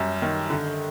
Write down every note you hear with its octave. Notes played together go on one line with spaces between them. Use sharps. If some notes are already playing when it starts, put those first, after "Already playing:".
Already playing: F#2 G3
D#3
D3